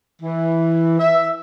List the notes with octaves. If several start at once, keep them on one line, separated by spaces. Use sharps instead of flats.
E3
E5